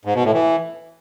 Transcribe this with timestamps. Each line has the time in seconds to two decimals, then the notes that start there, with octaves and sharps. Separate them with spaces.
0.05 G#2
0.15 B2
0.24 A2
0.34 E3